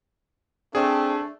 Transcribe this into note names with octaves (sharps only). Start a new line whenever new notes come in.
A3 C4 D4 G#4